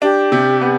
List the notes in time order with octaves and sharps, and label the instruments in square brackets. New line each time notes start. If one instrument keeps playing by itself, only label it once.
[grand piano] D4 [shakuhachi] G4
[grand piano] C3
B3